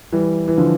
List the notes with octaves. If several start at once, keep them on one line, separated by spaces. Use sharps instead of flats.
E3 G3
E3
D3 F3